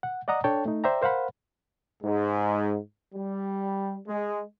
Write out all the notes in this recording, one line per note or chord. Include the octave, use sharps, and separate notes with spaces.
F#5
D5 D#5 F#5 A#5 D#6
D4 A4 C#5 G5 A5
A3 D#4
C5 D5 E5 G5 A#5
A#4 C5 F5 F#5 B5
G#2
G3
G#3